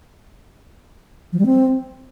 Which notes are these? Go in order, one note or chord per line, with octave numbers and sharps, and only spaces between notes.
F3
G3
C4